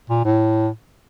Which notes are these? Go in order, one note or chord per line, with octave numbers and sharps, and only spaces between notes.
A#2
A2